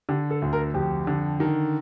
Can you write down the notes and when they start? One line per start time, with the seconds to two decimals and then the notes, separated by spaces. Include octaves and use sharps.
0.09 D3 G4
0.30 A4
0.42 D2
0.53 A#4
0.74 F2 G4
1.07 D3
1.40 D#3